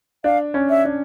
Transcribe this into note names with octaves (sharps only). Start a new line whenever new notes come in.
D4 F5
C#4
E5
D4